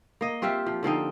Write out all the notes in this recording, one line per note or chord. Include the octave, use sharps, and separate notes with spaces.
A#3 D#5
C4 F4 G4 E5
F3
D3 F3 C4 D#4